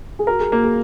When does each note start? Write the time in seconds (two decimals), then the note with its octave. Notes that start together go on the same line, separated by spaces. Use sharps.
0.19 G#4
0.27 F#4 A#4
0.40 G#4
0.51 A#3 F#4
0.64 G#4